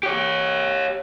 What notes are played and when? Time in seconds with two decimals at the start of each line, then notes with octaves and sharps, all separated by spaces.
0.03 G4 C#5